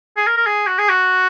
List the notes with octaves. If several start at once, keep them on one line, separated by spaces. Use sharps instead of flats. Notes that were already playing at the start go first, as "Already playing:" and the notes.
G#4
A#4
A#4
G#4
F#4
G#4
F#4